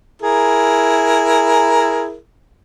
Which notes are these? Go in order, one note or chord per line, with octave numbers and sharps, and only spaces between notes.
E4 G#4 A#4